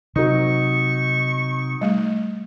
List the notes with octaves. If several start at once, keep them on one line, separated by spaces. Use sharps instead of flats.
C3 F#3 D#4 C#6
G3 A3